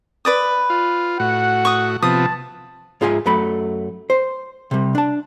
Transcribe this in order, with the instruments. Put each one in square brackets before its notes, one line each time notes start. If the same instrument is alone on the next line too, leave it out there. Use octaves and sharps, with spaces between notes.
[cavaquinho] B4 D5 D#6
[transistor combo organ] F4
[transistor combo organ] A2 F#4 [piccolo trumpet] F#5
[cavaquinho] C#6 D#6
[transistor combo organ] C3 F3 B3 [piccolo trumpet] A5 [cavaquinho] D#6
[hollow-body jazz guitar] G#2 F4 G#4 E5 G#5
F#2 F#3 A3 B5
C5
C3 G3
D4 A5